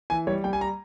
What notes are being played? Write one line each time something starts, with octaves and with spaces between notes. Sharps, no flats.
E3 G#5
G3 C#5
G3 G5
G#5
A#5